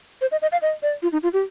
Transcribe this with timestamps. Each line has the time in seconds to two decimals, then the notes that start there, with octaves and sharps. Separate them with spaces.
0.21 C5
0.32 D#5
0.42 D#5
0.52 F5
0.62 D#5
0.83 D5
1.02 F4
1.12 D#4
1.23 F4
1.33 G4